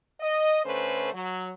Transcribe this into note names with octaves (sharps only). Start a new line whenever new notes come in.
D#5
D3 A3 C#4 B4 C5
F#3